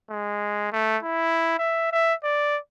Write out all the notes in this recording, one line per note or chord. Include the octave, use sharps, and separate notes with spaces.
G#3
A3
E4
E5
E5
D5